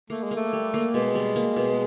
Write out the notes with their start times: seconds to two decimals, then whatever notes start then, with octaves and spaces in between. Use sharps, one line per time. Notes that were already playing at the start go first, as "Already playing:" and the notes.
0.10 A3 A#3
0.24 G#3
0.31 A#3
0.36 A3
0.53 G3
0.74 A#3
0.94 B2 G#3
1.15 G3
1.36 A#3
1.56 B2